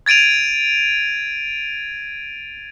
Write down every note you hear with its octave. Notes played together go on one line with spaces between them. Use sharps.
G#6 A6 D7 D#7 F7